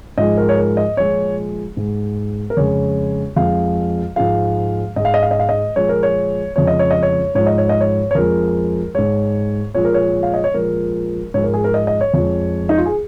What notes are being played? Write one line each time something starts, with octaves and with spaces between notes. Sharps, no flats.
G#2 F3 G#3 D#5
A#4
C#5
A#4
D#5
A#2 F3 G#3 C#5
G#2 G#3
A#4
F2 C#3 G#3 C#5
F2 F3 G#3 F5
G#2 F3 G#3 F5
G#2 G#3 D#5
F5
D#5
F5
D#5
F5
D#5
A#2 F3 G#3 C#5
A#4
C#5
F2 C#3 F3 G#3 C#5
D#5
C#5
D#5
C#5
G#2 F3 G#3 C#5
D#5
C#5
D#5
C#5
C#5
F2 F3 G#3 A#4
G#2 G#3 C#5
A#2 F3 G#3 C#5
A#4
C#5
F5
D#5
C#5
A#2 F3 G#3 A#4
G#2 F3 G#3 C#5
A#4
G#4
A#4
D#5
D#5
C#5
F2 F3 G#3
D#4
F4
G#4